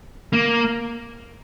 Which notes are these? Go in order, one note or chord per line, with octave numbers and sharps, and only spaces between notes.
A#3